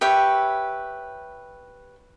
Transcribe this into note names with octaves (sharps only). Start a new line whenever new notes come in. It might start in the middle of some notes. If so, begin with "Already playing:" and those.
G4 B4 C#5 E5